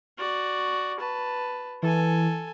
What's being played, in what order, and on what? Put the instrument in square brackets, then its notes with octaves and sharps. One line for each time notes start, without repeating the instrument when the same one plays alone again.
[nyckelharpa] F#4 D5
B4 A5
[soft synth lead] E3 [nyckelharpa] A4 G#5